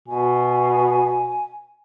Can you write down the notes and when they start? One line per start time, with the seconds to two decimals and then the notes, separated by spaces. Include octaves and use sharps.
0.08 B2 G#5